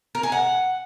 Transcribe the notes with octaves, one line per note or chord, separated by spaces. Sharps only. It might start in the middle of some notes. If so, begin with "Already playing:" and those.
A#4
G#4
F#5